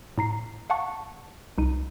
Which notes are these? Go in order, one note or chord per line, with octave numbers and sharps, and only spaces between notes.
A2 A#5 C7
F5 F#5 A5 C#6
C2 D#4 D#7